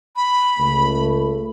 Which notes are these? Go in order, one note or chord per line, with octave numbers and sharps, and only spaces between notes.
B5
C#2 A3